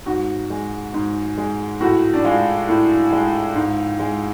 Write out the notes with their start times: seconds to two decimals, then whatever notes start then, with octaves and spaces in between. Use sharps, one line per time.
0.06 G#2 F#4
0.50 G#3
0.94 G#2
1.38 G#3
1.81 A2 F#4
2.13 D4
2.25 G#3 F4
2.68 A2
3.13 G#3
3.56 G#2
4.00 G#3